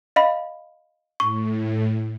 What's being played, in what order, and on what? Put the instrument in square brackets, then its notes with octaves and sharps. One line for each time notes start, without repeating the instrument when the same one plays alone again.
[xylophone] D#5 F5 B5
[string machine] A2 [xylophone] C#6